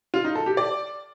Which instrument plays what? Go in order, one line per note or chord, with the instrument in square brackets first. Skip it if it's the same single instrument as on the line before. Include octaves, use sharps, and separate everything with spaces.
[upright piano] F4
D#4
A4
G4
D5